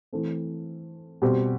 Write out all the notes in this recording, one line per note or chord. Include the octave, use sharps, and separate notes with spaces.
E3 A3 C4
B2 G3 C4 G4